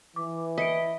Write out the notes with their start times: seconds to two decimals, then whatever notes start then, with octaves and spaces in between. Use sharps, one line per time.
0.16 E3 D6
0.58 E4 D#5 B6 C#7 D7